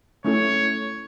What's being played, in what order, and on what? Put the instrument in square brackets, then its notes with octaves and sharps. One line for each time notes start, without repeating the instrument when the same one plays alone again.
[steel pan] A3 C#4 E4 A4 [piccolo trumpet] C#5